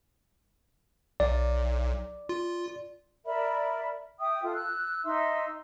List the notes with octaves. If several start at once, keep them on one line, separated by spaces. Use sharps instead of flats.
B1 D5
F4
A#4 D5 E5 B5
E5 G5 D#6
F4 A4
E6 F#6
D#4 E5 C6 E6